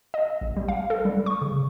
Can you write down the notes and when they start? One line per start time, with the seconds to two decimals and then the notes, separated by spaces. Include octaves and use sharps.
0.14 D#5
0.41 A#1
0.57 G3
0.68 F5
0.90 A4
1.05 G3
1.26 C#6
1.42 C#3